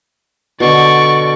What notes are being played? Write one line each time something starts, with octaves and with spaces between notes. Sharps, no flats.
B2 D3 D5 C#6